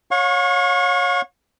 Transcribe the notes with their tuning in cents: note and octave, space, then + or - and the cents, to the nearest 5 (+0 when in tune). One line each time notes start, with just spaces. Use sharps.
C#5 +0 F5 +45 C#6 -25